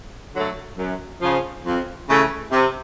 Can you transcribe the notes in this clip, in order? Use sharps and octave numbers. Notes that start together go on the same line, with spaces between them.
D3 F#3 A3
F#2
C#3 F3
F2
C#3 E3 A3
C3